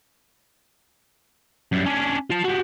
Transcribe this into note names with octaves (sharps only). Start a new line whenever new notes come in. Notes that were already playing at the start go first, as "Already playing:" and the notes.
F#2 G3
C#4 D4
F4 A5
F#4 G4